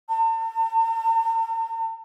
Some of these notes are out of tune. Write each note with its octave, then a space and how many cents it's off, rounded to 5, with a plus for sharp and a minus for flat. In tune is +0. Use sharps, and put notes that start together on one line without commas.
A5 +45